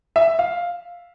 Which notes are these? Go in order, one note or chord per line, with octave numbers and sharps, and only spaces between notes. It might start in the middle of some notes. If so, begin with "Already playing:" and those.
E5
F5